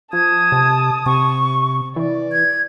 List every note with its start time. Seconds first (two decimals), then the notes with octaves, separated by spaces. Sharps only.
0.13 F3 A5 D#6 G#6
0.52 C3
1.06 C3 C#6
1.96 E3 D5
2.32 G#6